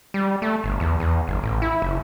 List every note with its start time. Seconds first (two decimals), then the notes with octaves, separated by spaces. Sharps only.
0.14 G3
0.42 A3
0.64 G1
0.80 E2
1.00 E2
1.28 G1
1.43 A1
1.62 E4
1.82 F#1